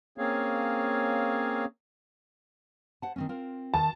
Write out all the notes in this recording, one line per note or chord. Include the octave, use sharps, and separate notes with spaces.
A#3 C4 C#4 G#4 C#5 F5
C5 F#5 A5
D#3 C4 C#4
C4 F4 A#4
D#3 A5